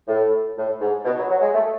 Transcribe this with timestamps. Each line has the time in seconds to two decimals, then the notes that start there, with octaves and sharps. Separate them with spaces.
0.08 A2
0.57 A2
0.81 G#2
1.05 B2
1.17 F#3
1.30 F#3
1.42 G#3
1.54 A3